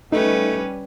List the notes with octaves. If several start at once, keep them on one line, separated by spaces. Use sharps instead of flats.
G3 A3 C#4 D#4 B4